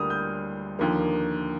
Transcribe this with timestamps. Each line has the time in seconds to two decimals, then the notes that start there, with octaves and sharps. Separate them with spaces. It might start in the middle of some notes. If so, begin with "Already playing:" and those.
Already playing: D2 D3 G3 A#3 D#6 F6
0.10 G6
0.79 D#2 D3 F3 A#3